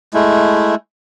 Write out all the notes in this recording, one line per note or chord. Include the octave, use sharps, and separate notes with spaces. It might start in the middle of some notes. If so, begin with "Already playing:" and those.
G#3 A3 E4